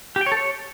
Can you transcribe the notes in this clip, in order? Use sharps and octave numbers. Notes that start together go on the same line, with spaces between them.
G4
G5
C#5
A4
C#5